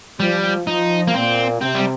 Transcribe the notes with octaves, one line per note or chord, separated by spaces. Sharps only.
F3 G3
F3 D#4
A#3
A#2 C4
C3 C4
G3